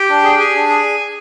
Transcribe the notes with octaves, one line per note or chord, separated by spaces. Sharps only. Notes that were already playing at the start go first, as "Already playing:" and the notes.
Already playing: G4 G5
D4
G#4
G#4 G#5
D4
G#4